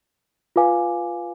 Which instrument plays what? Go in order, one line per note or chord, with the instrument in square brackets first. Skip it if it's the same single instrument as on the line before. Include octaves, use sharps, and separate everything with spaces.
[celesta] F4 B4 F5 G#5 D6